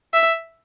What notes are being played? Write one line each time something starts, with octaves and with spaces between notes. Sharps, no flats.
E5